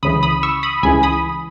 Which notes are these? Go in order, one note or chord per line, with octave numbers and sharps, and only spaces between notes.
C#2 C#3 E3 B5 D#6
B5 D#6
C#6 E6
B5 D#6
C#2 C#3 E3 G#5 B5
B5 D#6